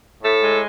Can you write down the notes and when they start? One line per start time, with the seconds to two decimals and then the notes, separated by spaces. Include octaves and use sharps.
0.22 A2 A4
0.41 G#3